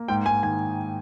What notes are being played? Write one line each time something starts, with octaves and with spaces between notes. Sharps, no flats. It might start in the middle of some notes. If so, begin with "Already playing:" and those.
Already playing: A#3
G#2 G5
G#2 G#5
D#3 G#5